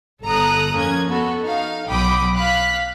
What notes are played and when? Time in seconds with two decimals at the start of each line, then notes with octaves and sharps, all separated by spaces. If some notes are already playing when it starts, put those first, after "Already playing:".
0.24 G1 A4 A#5 D#6 F#6
0.74 F2 A#3 C#4 G#6
1.09 B3 F#4 A4
1.43 D#4 F5
1.88 B1 F#3 G5 B5 D6 D#6
2.35 F5 F#6 B6